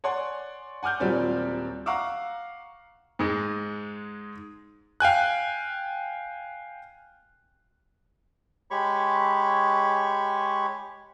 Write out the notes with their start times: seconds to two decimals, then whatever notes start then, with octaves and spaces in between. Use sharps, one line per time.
0.04 C#5 D5 F#5 G#5 C6
0.83 F#5 G#5 D6 F6 G6
1.00 D#1 F#3 G3 C4 F4 D5
1.86 F5 F#5 A#5 C#6 D6 E6
3.19 G#2 G#3
5.00 F5 G5 G#5 F#6
8.71 G#3 G4 C#5 B5 C#6